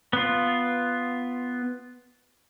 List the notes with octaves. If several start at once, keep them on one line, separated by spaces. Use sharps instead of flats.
B3 F4